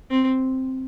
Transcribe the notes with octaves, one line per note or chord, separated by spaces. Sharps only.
C4